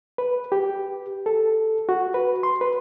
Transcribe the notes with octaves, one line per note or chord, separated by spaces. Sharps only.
B4
G4
A4
F#4
B4
C6
B4